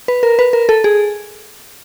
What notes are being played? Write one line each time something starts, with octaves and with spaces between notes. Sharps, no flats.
B4
A#4
B4
A#4
A4
G#4